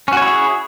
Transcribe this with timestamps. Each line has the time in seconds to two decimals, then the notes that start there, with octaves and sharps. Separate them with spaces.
0.08 C#4
0.13 F#4
0.17 C#5
0.22 E4
0.26 G#4